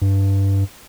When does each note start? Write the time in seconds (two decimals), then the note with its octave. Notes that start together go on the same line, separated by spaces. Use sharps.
0.02 G2